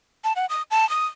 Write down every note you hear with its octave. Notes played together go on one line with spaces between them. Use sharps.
A5
F#5
D#6
A5
D#6